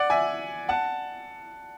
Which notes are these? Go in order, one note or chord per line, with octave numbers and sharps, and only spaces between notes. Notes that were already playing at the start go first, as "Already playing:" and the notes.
Already playing: D5 F#5
E5 G#5
F#5 A5